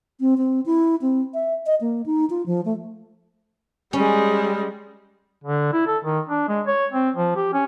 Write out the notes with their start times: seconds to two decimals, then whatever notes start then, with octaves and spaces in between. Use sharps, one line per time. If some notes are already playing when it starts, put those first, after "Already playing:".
0.20 C4
0.37 C4
0.66 E4
1.02 C4
1.34 E5
1.66 D#5
1.81 A#3
2.06 D#4
2.30 F4
2.46 F3
2.65 A3
3.93 G3 G#3 C#4
5.44 D3
5.73 E4
5.87 A4
6.05 D#3
6.29 D4
6.48 G#3
6.67 C#5
6.92 C4
7.16 F3
7.36 G4
7.53 C#4